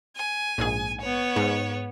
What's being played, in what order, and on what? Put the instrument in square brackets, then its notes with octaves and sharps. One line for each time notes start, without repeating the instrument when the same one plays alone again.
[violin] G#5
[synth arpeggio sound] A#1 G#2 G#4
[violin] B3 C#5
[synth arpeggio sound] G#2